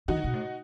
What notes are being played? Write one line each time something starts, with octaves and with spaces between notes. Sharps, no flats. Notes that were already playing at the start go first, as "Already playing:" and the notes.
E3 D#4 F#4
D#3
B2
A2